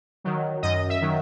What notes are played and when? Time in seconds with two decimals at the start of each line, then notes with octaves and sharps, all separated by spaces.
0.24 D#3 F#3
0.62 F#2 D#5
0.89 E5
1.01 D#3 F#3